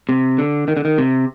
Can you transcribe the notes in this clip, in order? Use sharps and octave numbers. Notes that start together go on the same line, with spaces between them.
C3
D3
D#3
D3
D#3
C3